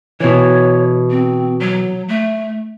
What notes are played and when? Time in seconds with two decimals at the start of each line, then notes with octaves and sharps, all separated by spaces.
0.20 B2 E3 C#5
1.10 C4
1.61 F#3
2.09 A3